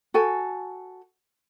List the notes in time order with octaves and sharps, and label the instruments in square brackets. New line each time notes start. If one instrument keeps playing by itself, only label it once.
[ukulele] F#4 A4 G#5